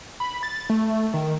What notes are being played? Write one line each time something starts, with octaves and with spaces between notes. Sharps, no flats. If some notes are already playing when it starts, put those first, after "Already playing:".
B5
A6
A3
D#3